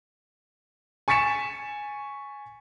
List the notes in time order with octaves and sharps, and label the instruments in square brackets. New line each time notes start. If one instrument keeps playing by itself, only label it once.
[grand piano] G#5 C#6 A6 B6 C#7 E7